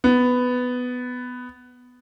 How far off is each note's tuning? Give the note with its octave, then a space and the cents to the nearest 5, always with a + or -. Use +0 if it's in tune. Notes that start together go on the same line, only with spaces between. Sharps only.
B3 +10